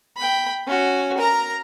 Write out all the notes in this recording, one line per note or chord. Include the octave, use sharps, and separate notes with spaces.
G5 B5
C#4 F#4
A#4 A#5